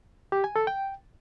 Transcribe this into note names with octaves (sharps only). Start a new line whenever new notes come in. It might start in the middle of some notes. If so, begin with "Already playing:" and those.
G4
G#5
A4
G5